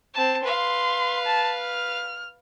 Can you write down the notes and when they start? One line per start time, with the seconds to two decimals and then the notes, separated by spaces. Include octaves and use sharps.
0.14 C4 A5
0.44 B4 F5 C6
1.26 A5
1.59 F6